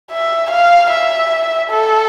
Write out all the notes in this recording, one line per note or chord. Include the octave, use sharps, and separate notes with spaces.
E5
F5
E5
A4